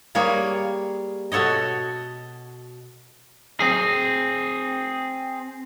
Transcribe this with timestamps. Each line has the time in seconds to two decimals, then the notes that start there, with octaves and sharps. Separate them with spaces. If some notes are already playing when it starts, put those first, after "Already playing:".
0.15 G3 A#3 G#4 A#4 C#5
1.32 B2 F#4 A4 C#5 D#5
3.60 C4 G#4